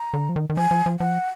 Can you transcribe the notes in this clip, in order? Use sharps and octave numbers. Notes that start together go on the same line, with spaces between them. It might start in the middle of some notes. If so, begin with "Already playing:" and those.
Already playing: A#5
D3
F3
D#3
D#3
F3 G#5
F3
F3
F3 F#5